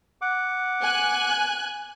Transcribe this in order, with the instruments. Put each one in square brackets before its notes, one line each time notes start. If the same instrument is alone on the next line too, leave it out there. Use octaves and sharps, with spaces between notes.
[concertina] F#5 D6
[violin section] G#5 F#6